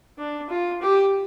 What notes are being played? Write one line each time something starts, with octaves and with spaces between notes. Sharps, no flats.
D4
F4
G4